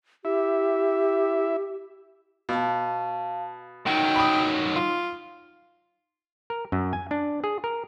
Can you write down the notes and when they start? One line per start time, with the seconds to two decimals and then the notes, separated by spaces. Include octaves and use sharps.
0.25 E4 G4 E5
2.49 B2 F5 A5
3.87 D#3 F#3 D#4 G5
4.16 B5 D#6
4.76 F4
6.50 A#4
6.72 F#2
6.93 G#5
7.11 D4
7.44 G#4
7.64 A#4